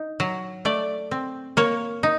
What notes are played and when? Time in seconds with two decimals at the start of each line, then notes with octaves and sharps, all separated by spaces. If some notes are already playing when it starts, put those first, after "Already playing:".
Already playing: D#4
0.20 F#3
0.65 A3 D5
1.11 C4
1.57 A#3 C#5
2.03 D#4